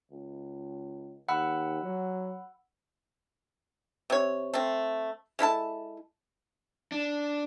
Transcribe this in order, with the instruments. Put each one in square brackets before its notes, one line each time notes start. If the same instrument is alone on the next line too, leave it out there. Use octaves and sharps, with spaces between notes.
[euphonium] C#2
[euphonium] D#2 [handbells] F#5 B5 E6
[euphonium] F#3
[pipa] C3 C#5
A3 C4
G#3 E4 A4 A5
[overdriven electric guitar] D4